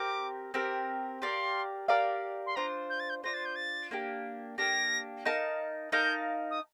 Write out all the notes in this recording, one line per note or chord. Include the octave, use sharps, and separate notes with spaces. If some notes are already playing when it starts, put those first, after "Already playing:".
Already playing: C4 G4 A#4 D6
C4 G4 A#4
G4 A#4 D5 F5 C6
G4 A#4 D5 F5
C6
D4 F4 C5 A#5
G6
A6
G6
D4 F4 C5 A#6
A6
G6
A6
A#3 D4 G4
A#3 D4 G4 A#6
D#4 A#4 F5 A5
D#4 A#4 F5 A5 G6
D#6